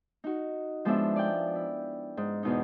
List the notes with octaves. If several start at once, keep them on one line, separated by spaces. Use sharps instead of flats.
D#4 F#4
F3 G#3 B3 C#4 D4 E5
D5 G5
E4
G#2
E2 B2 D#4